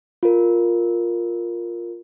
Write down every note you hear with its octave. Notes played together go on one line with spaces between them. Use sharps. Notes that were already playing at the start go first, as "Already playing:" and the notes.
F4 A#4